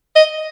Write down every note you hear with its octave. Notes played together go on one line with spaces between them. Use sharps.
D#5